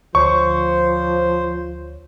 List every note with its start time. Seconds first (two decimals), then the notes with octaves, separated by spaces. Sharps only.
0.15 D2 F3 C5 C#5 C#6